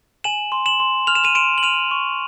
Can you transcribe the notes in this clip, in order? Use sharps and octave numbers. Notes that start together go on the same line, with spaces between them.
G#5 E7 F#7
C6
E7 F#7
C6
F6 F7
E7
D#7 F7
C6 D7 E7
F#7
F6 D#7 F7
C#6